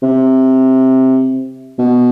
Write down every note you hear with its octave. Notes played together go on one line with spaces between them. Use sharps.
C3
B2